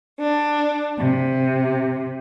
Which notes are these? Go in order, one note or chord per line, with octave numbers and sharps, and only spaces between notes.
D4
C3